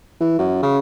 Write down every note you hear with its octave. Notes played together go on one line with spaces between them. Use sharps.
E3
F#2
C#3